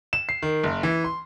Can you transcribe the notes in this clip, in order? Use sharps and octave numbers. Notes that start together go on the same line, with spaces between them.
E7
C7
D#3
F#1
E3
C6